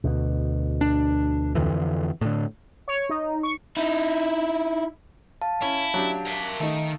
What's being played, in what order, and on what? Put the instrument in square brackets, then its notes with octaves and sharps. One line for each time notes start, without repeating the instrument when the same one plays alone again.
[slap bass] D2 B2
[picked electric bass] D4
F2 D3 E3
A2 D3
[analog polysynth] C#5
D#4
C#6
[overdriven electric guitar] D#4 E4
[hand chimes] F5 A5
[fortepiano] C#4 [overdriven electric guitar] E4
[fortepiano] F#3 D4 G4
[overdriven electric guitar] A#4 E5
[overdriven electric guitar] D#3 [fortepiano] A3 D#4